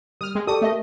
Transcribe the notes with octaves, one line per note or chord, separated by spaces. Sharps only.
G3 D#6 F6
G#3 G5
G4 A4 D5 A5 C#6 D#6
A3 A#4 D#5 E5 D#6